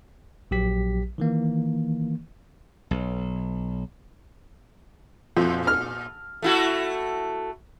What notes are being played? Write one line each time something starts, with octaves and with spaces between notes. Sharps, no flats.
A#1 F#3 G4 B6
D#3 E3 A#3
B1
F2 A#2
F6
A3 E4 F#4